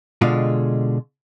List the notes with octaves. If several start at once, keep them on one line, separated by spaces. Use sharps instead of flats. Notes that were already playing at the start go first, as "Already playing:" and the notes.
B2 D3 G#3 F4